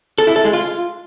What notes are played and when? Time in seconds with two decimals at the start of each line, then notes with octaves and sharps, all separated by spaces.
0.18 A4
0.27 E4
0.36 A4
0.45 G#3
0.53 F4